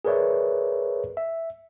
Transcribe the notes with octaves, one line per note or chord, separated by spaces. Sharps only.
G#4 A#4 B4 C#5 D5 E5
E5